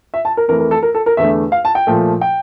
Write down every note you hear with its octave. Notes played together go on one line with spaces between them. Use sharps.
E5
A5
A#4
F2 E3 A3 A#4
A#4
A4
A#4
A4
A#4
E2 D3 A3 E5
F5
A5
G5
A#2 F3 A3
G5